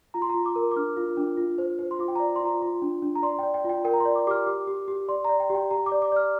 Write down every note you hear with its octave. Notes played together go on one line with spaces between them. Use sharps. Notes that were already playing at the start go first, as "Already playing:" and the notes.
F4 A#5
C6
F4 A#5
D6
A#4
D6
D4 F6
F4
D4
F4
C5
C5
C6
F4 D6
G5
D5 A#5
C6
F4 A#5
F4 C6
D4
D4
A#5
D5 C6
D5 G5
G5
F4
G5
A#4 G5
A#5
C6
D5
D6
G4 D6 F6
G4 D6
G4
G4
D5 C6
D5 A#5
G5
G4
G5
G4 A#5
D6
D5
D6
D5 F6